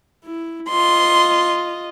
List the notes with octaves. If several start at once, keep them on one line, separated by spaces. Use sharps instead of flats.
E4
F4 D#5 C6